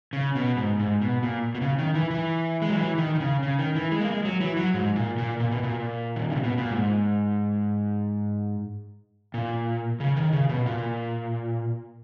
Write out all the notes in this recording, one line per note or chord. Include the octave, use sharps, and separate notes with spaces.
C#3
B2
G#2
G#2
B2
A#2
B2
C#3
D#3
E3
E3
G#3
F#3
E3
D#3
D#3
C#3
C#3
D#3
E3
G#3
A#3
G#3
F#3
E3
F#3
G#2
A#2
A#2
A#2
B2
A#2
D#3
C#3
B2
A#2
G#2
A#2
C#3
D#3
C#3
B2
A#2